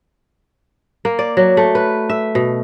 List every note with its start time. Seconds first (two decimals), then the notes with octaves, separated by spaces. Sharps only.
1.05 A#3
1.19 D5
1.37 F#3
1.57 A3
1.75 B4
2.09 E5
2.35 B2